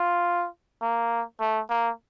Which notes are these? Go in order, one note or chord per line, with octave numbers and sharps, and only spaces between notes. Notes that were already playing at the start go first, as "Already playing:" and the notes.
Already playing: F4
A#3
A3
A#3